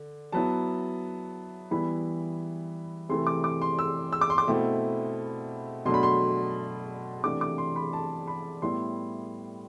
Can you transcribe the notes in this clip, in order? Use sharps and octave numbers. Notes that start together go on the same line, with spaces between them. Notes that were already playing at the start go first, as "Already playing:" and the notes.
Already playing: D3
F#3 B3 E4 A5
E3 G3 B3 E4 B5
C3 E3 A3 C6
D6
D6
C6
E6
E6
D6
C6
D6
B2 A3 C4 E4
B2 F#3 A3 D4 C6
B5
C6
C3 E3 A3 D4 D6
D6
C6
B5
A5
B5
A2 G3 B3 E4 C6